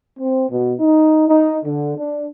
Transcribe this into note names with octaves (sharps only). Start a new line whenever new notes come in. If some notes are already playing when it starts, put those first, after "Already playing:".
C4
B2
D#4
D#4
D3
D4